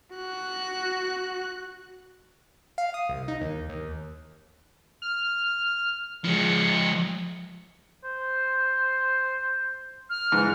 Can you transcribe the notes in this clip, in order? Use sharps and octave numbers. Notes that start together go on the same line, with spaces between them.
F#4 F#6
F5
D#6
C2
D#4
D#2
D#2
F6
F3 G#3 C#7
C5
F6
G#2 E3